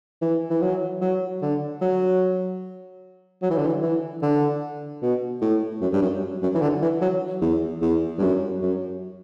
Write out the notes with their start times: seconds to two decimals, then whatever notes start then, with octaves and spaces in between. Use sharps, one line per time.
0.22 E3
0.50 E3
0.62 F#3
1.01 F#3
1.42 D3
1.81 F#3
3.42 F#3
3.51 E3
3.58 D3
3.67 E3
3.82 E3
4.22 D3
5.02 B2
5.41 A2
5.81 F#2
5.92 G2
6.02 F#2
6.42 F#2
6.55 E3
6.62 D3
6.82 E3
7.02 F#3
7.42 E2
7.82 E2
8.18 G2
8.22 F#2
8.62 F#2